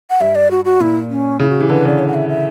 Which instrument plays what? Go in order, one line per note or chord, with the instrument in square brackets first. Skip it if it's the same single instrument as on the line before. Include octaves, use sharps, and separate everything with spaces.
[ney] F#5
[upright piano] G2 [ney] E5
[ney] D5
F#4
F#4
[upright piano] A#2 [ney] E4
[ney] C#4
[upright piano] C#3 [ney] E4
[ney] F#4
[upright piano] E3 [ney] G4
[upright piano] D3 [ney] B4
[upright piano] C#3 [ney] D5
[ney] C#5
F#5
E5
E5